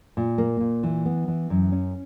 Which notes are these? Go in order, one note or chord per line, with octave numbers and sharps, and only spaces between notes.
A#2
A#3
A#2
E3
B3
E3
F#2
C#4